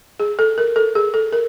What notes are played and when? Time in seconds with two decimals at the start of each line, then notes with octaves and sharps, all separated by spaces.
0.20 G#4
0.39 A4
0.58 A#4
0.76 A4
0.95 G#4
1.14 A4
1.33 A#4